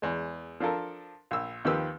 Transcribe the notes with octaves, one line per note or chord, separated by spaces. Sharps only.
E2 G#3
F3 D4 F4 A4 A#4
A#1 E6
D#2 D#3 F3 G4 B4 E6